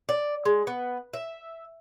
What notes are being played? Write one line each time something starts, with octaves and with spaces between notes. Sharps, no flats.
D5
G#3
B3
E5